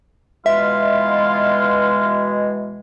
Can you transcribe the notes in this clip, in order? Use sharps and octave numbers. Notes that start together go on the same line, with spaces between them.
B2 E3 G#3 F4 E5